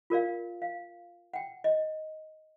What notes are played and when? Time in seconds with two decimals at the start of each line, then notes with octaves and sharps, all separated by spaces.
0.10 F4 A#4 D5 F5
0.62 F5
1.34 F#5 G5
1.64 D#5